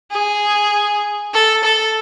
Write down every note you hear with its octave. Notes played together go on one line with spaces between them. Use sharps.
G#4
A4
A4